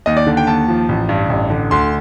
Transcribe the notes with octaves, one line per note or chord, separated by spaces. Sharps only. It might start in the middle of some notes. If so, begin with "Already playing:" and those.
D#2 D#5
D5
D3
G5
D#2 A5
F3
A1
G2
A1
D3
D2 C6